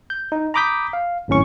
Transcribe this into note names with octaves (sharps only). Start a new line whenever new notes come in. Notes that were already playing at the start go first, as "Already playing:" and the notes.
G6
D#4
A#5 B5 D6 D#6 G6 B6
F5
G#1 F#2 A2 C#4 C#6